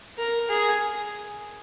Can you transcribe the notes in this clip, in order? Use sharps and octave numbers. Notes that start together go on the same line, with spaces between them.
A#4
G#4